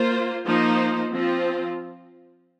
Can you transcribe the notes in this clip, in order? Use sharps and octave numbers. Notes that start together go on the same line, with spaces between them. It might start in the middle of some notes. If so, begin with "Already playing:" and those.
Already playing: A#3 F4 C5
F3 A#3 D#4 C5
F3 C4 F4